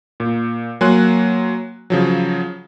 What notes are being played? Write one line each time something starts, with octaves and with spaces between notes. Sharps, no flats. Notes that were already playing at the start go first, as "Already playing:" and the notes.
A#2
F#3 A#3 G#5 C6 F#6
C#3 F3 F#3